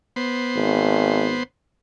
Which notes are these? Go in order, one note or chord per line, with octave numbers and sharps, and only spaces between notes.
B3 C5
G#1